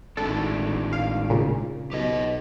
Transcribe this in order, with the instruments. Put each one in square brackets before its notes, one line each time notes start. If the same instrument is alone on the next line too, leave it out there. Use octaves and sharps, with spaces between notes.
[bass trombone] G#1 [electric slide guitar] A2 G#3 D4 [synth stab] A4
[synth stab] F5
A#2 C#3
[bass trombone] B1 [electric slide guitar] G4 B4 D#5